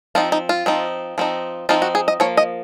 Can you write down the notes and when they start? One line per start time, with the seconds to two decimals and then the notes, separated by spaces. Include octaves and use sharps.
0.15 F3 C4 D#4 F4
0.32 D#4
0.49 F4
0.66 F3 C4 D#4
1.18 F3 C4 D#4
1.69 F3 C4 D#4 F4
1.82 F#4
1.95 G#4
2.08 D#5
2.20 F3 A#3 C#5
2.37 D#5